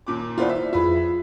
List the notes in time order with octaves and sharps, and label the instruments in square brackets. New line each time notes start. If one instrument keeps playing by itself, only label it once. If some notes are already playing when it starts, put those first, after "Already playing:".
[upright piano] D#2 A#2 D6
[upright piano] D#2 B3 F4 [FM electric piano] E4 C5 D5
[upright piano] E5
[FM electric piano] F2 F4 [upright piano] G#4 B4 E5